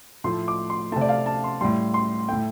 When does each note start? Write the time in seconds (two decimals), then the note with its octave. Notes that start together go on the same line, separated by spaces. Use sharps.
0.24 A2 F3 A3 C6
0.48 D6
0.70 C6
0.92 C3 A3 A5
1.01 D5
1.09 F5
1.26 A5
1.44 C6
1.61 A2 G3 C6
1.94 C6
2.28 A2 A3 G5